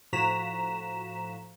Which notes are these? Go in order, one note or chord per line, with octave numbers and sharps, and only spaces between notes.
A2 F3 F#4 A#5 B6 E7